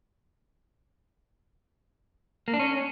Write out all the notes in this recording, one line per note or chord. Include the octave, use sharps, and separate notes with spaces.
A#3
D4
C#4